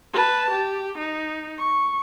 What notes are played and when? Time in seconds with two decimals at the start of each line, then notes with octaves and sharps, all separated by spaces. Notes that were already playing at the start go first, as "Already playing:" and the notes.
0.13 B4 A5
0.50 G4
0.98 D#4
1.58 C#6